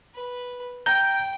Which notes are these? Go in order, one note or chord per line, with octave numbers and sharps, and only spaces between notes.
B4
G5 A#5 G6